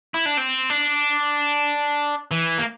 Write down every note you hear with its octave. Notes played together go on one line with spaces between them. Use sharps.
E4
D4
C4
D4
E3
A#3